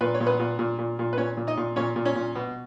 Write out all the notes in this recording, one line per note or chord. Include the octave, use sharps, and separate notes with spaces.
A#2 B4
C#5
A#2
B3 B4
A#2
A#2
A#2
A#2
B4
A#2 C#4 C#5
A#2
D#4 D#5
A#2
A#2 C#4 C#5
A#2
C#4 C#5
A#2
B2